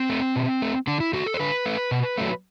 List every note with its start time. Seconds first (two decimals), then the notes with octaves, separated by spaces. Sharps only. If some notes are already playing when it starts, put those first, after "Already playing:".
Already playing: C4
0.10 A3
0.36 B2
0.62 A3
0.87 D3 D4
1.00 E4
1.13 A3 F#4
1.26 A4
1.34 C5
1.39 D3 B4
1.66 A3
1.91 B2
2.17 F#3 A3